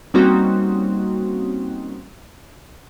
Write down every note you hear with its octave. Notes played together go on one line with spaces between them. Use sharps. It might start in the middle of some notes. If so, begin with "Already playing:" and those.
G3 A#3 C4 C#4 D#4 F#4